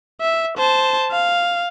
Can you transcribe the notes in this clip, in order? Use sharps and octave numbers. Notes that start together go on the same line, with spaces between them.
E5
C5 A5
F5